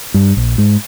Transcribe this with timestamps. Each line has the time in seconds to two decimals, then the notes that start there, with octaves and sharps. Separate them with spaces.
0.14 G2
0.37 A#1
0.58 G#2